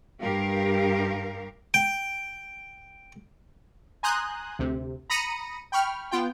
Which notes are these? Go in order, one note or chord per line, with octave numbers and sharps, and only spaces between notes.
G2 G4 A#4 F5
G5
G#5 A#5 C6 D#6 F#6 G6
D2 C3
A#5 B5 D#6 A#6 C#7 D#7
G5 B5 C#6 F6
B3 F4 G5